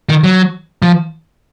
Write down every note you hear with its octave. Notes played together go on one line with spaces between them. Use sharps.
D#3
F#3
F3